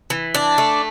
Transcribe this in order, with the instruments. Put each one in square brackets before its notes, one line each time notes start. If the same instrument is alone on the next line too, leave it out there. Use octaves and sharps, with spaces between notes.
[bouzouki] E3
D4
A3